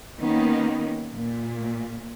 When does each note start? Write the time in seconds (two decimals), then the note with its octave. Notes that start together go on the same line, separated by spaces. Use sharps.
0.19 D#3 A#3 B3 C#4 D#4
1.15 A#2